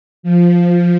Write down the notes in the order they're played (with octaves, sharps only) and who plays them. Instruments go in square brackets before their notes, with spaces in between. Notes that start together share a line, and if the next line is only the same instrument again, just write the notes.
[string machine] F3